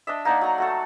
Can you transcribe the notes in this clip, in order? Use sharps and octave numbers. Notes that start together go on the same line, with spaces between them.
D4 D#5 E5
A#3 D#4 D5 F#5
F#3 F#5 A#5
A3 F#4 A4